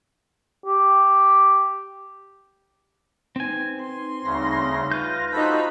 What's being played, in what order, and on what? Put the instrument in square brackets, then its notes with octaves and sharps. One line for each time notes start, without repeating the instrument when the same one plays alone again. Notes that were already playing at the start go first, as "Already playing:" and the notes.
[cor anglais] G4
[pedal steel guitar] C4 G#5 [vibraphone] D#4 B4 C5
[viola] C6
[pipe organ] D2 C#3 A#6 [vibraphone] G3 D#4 B5
[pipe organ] F4 A#6 [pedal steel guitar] B4 G6
[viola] D#4 B5 [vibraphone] F4 F5 A5 [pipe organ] F#4 A4 C5